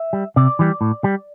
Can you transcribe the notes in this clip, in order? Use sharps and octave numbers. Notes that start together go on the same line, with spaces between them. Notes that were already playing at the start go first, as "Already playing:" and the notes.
Already playing: E5
G3
C3 D5
E3 G3
A2
G3